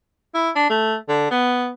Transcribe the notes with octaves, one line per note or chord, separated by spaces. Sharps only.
E4
D4
A3
D3
B3